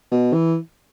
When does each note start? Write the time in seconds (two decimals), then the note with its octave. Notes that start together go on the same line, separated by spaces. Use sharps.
0.12 B2
0.33 E3